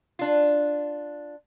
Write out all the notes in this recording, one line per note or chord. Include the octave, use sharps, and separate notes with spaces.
D4 F4